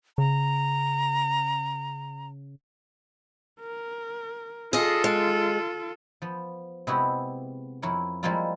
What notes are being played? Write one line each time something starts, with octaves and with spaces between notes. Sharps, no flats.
C#3 A#5
A#4
F4 G#4 A4 D#5
G#3
F3 B3
C3 G#3 B3 E4 F#4 G4
F2 E4 A#4 C#5
F3 G3 G#3 A#3 E4 F4